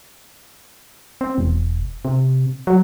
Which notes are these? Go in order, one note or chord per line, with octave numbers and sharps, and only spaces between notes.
C4
E1
C3
F#3